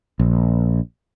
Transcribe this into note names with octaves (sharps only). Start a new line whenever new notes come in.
A#1